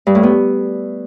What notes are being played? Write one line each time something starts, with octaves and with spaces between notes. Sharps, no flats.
G2
A2
B3